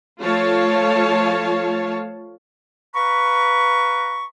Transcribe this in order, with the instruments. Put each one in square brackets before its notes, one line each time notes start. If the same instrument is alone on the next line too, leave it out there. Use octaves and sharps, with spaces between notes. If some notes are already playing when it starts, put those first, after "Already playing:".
[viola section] F3 A3 F4 C#5 F5 A5
[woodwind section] B4 F5 A#5 B5 C#6